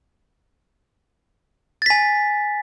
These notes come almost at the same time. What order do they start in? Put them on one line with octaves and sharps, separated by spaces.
A6 B6 G#5